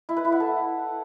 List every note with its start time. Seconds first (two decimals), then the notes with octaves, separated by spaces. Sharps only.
0.09 E4
0.17 B4
0.24 E4
0.32 F#5
0.40 A4